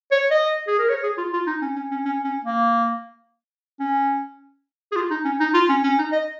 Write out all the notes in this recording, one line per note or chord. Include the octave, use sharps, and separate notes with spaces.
C#5
D#5
G#4
A#4
C#5
G#4
F4
F4
D#4
C#4
C#4
C#4
C#4
C#4
A#3
C#4
G#4
F4
D#4
C#4
D#4
F4
C#4
C#4
D#4
D#5